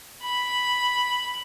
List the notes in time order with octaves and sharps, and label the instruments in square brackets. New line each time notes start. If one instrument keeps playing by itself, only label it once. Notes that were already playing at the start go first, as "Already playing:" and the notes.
[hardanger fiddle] B5